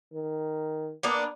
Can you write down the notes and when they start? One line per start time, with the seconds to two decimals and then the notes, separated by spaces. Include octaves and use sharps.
0.13 D#3
1.03 A#3 B3 D4